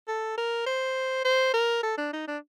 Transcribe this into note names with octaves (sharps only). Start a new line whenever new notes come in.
A4
A#4
C5
C5
A#4
A4
D4
D#4
D4